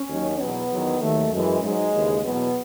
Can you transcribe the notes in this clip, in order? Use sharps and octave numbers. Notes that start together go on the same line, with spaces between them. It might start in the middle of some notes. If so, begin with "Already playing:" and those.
Already playing: C#4
D#2 D#3 F#3
E2 B2 F#3 B3
E2 D#3 F#3
D#2 D#3 F#3 A3
F#2 E3 G#3
G#2 F#3 G#3
D#2 C#3 E3
E2 B2 F#3 B3